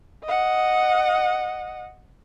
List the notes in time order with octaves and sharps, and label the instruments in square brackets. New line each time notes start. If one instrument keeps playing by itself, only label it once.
[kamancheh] D#5 F#5